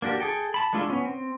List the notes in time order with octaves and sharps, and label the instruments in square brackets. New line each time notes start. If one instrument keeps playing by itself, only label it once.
[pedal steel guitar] A#3 D4 F#4 G4
G#4 A4 G5
A5 B5
G#3 A3 D4 F4 A4
B3 C#4
C4